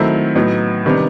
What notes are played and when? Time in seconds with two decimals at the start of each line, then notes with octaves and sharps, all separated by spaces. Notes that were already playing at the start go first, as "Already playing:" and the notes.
Already playing: D#3 F#3 A3 C4 E4
0.35 A2 F#3 B3 D#4
0.85 C3 D#3 G3 B3 D4